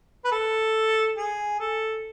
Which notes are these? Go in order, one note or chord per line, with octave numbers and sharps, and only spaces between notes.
B4
A4
G#4
A4